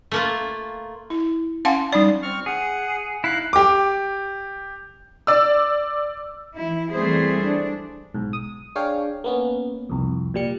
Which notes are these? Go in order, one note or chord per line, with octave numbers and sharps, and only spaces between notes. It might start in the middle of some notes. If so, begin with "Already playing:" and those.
A3 A#3 F4
E4
C#4 F5 F#5 G#5 A5 C6
G3 D#4 D5
C4 C#6 F6
G#4 F#5
D#4 E4 F5 F#6
G4 D6
D5 E6
E3 E4
E3 G3 A3 C4 G#4 C5
D4
B1 G#2
D#6
D4 G#4 C#5 F5 G5
A#3 B3 C#4
C2 F2
A#2 G3 C#7